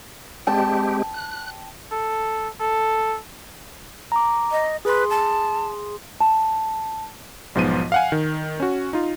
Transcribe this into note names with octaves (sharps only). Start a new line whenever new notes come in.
G#3 C4 G4 G5 A5
F#6
A4
A4
A#5 D6
D#5
G#4 B4 C6
A5
A5
B1 G#2 F3 B3 F4 D#7
F5 F#5 G#5
D#3
C#4 F#4
D#4 F4